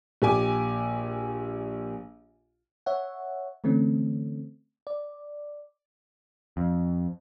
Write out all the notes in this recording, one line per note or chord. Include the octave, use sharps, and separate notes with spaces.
A#1 G4 G#5 D6
C#5 E5 F#5
D3 E3 A3 C4 C#4
D5
F2